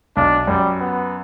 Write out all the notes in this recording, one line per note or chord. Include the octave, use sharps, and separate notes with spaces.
B1 D4
F#2 G3
B3